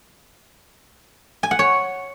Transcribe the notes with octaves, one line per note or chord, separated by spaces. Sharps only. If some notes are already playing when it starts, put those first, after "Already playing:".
G#5
F#5
C#5